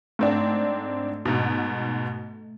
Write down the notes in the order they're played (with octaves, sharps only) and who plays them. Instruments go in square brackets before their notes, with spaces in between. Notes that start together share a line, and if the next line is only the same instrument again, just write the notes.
[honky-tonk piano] G#2 C4 D4 [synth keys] A3
[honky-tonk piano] G#2 B2